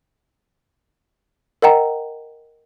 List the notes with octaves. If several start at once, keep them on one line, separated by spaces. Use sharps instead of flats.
A#4 D#5 F#5 G5 A#5